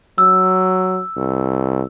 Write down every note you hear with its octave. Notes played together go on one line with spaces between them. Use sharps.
F#3 E6
C2